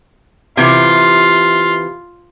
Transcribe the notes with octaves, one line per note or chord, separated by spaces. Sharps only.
C3 E3 F4